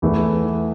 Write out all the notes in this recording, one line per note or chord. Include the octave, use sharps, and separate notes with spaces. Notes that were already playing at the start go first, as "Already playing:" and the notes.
E2 E3 A3 E4 B4